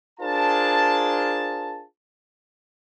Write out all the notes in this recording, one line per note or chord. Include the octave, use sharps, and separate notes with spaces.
D4 F4 G#4 A#4 C5 A5